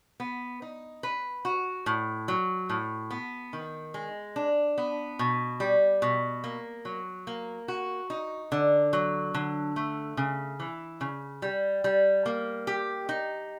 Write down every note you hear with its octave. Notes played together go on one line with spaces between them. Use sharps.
B3
D#4
B4
F#4
A2
F#3
A2
B3
D#3
G#3
D4
B3
B2
G3
B2
A#3
F#3
A#3
F#4
D#4
D3
F#3
D3
A3
C#3
E3
C#3
G3
G3
A#3
G4
D#4